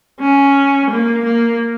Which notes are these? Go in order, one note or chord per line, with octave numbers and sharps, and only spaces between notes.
C#4
A#3
A#3